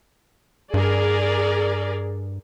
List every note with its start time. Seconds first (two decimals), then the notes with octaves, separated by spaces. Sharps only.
0.74 G2 G#4 A#4 D5